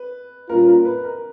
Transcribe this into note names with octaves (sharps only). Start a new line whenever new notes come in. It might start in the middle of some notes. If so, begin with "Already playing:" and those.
Already playing: B4
A#2 G3 A#3 C#4 F4 A#4
A#4
B4
A#4